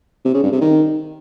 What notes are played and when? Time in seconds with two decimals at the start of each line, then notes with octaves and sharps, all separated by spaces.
0.25 C3
0.34 C#3
0.43 G2
0.52 C3
0.61 D#3